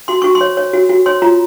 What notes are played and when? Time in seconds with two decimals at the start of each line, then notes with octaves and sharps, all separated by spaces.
0.08 F#4 C6
0.22 F#4 C#6
0.35 C6
0.41 C#5
0.57 C#5
0.74 F#4
0.89 F#4
1.06 C#5 C6
1.22 F4 A#5